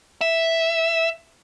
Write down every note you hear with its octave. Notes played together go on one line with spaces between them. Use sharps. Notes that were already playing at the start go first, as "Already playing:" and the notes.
E5